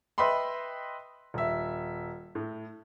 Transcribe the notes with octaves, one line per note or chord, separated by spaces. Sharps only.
B4 D#5 E5 G5 B5 C6
D#1 E5
A2